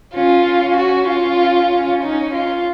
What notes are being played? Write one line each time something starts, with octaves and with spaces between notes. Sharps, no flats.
C#4 F4
F#4
F4
C#4
D#4
F4